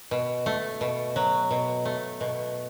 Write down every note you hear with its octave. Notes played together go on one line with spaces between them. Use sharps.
B2
A3
B2
F#3
B2
A3
B2